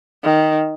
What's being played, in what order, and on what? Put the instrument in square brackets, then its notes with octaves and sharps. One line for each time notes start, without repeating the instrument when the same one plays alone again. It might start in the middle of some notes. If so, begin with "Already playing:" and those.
[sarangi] D#3